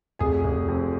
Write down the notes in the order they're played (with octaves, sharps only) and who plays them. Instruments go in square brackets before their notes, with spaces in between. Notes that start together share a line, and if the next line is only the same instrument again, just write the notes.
[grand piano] F1 G#4 G#5
F1
F2